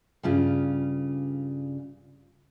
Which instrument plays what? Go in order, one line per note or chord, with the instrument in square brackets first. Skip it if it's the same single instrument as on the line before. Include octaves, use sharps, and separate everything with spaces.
[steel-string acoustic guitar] G2 C#3 F4